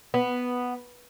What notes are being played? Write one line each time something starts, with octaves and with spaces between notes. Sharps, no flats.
B3